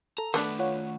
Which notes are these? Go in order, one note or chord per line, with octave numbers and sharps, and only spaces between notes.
A4 A#5
D#3 A3 B3 D4
F4 C#5 F#5